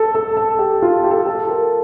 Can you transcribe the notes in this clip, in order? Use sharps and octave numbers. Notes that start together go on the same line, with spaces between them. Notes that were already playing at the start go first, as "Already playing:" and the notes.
Already playing: A4
A4
A4
G4
F4
G4
A4
G4
A4
A#4